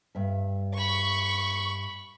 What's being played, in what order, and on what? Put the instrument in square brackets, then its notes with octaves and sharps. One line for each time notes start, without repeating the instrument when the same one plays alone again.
[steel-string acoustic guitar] G2 E5
[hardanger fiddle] B5 [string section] C#6